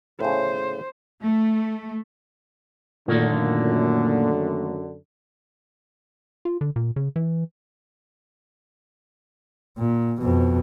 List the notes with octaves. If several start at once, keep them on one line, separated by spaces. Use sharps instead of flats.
A2 C#3 C5
A3
F#2 A#2 D3 D#3 A3 A#3
F4
D3
A#2
C#3
E3
A#2
F2 B2